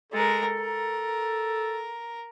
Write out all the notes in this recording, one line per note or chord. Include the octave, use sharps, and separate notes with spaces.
G#3 A4 A#4
A#4